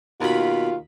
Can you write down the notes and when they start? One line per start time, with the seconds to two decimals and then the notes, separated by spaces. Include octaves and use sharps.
0.21 D#2 B2 F4 B5